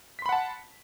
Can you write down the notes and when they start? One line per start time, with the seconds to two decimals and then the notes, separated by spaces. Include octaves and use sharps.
0.19 B6
0.22 C6
0.26 B5
0.29 F#5
0.32 A5